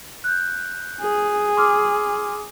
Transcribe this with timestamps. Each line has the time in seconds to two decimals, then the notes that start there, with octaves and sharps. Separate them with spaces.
0.24 F#6 G6
1.01 G#4
1.57 C6 D6 F6